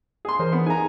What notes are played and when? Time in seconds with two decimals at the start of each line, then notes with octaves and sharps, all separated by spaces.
0.25 G#4 C6
0.39 E3 A#4 C5
0.53 B3
0.66 D#4 G#4 G#5 A#5